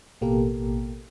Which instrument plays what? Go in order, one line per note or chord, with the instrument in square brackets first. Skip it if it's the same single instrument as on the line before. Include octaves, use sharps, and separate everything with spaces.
[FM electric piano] A1 B2 A#3 G4 A4 A#4